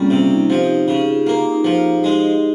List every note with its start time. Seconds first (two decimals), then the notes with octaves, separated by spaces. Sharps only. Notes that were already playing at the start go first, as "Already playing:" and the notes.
Already playing: C#3 G3 A#3 C4 C#4 F4
0.10 C3 F4
0.30 D#4
0.50 F3 G4
0.57 F4
0.64 D#4 G4
0.88 C#3
1.00 F4 G#4
1.26 A#3 F4
1.53 D#4
1.64 F3
1.78 F4
2.03 G#3 D#4 G4